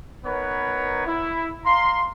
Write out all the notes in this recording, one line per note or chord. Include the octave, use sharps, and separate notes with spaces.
B3 D#4 A#4 B4 C#5
E4
F5 A#5 C6